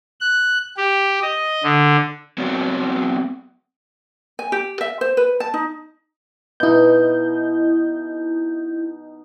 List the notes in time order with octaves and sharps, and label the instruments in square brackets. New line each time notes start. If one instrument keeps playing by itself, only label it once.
[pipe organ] F#6
G4
D#5
D3
[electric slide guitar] F#3 B3 C4 F#4 C#5 D5
[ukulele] G#5
G4
E5
C5
B4
A5
D#4
[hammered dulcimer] B2 D#4 [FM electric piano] E4 G6